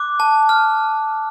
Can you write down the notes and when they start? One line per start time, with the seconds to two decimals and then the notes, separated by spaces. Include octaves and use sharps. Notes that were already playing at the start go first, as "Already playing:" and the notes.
Already playing: D6 F#6
0.20 A5
0.49 F6